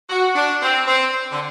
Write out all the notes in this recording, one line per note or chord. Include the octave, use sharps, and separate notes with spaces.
F#4
D4
C4
C4
D3